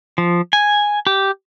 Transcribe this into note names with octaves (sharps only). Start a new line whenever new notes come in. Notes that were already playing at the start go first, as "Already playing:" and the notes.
F3
G#5
G4